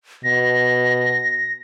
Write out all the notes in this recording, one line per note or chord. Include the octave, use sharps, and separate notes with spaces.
B2 A#6